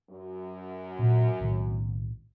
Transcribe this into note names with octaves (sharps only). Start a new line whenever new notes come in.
F#2
A#2
B1 A2 D#3